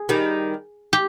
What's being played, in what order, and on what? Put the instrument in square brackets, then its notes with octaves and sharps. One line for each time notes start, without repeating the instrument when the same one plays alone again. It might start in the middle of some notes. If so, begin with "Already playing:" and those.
Already playing: [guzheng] G#4
[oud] D#3 G3
[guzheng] G4